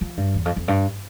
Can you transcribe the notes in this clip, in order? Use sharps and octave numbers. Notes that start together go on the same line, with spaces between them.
F3
G2
E2
F2
F2
G2